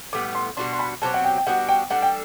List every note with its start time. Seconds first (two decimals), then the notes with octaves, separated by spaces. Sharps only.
0.13 A2 G3 B3 D6
0.35 C6
0.57 B2 G3 D4 F#4 C6
0.73 C6
0.79 B5
1.02 B2 F#3 C4 G4 A5
1.14 F#5
1.24 G5
1.38 G5
1.47 G3 B3 D4 F#4 F#5
1.69 G5
1.90 G3 D4 A4 F#5
2.02 G5